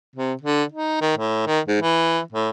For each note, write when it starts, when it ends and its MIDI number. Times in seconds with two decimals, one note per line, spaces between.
0.16 0.34 48
0.42 0.64 50
0.72 1.00 63
1.01 1.14 51
1.18 1.42 45
1.46 1.60 51
1.68 1.78 44
1.82 2.21 52
2.33 2.50 45